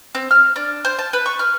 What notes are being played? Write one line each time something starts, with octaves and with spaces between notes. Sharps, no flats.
C4
F6
D4
C5
A5
B4
C#6
F6